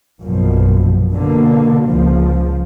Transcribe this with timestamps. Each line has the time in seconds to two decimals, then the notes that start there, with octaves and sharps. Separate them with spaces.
0.21 A#1 F#2 B2 F3
1.12 B2 D3 A#3
1.87 C#2 F3